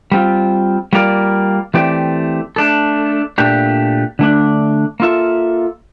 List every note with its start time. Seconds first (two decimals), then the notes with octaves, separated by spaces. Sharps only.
0.12 G3 C4 F4
0.93 G3 A#3 F4 A#4 D5
1.74 E3 A3 C4 G4 D5
2.56 A3 D4 A4
3.38 A#2 A3 D4 G4
4.19 D3 A3 D4
5.00 A#3 F4 A4 E5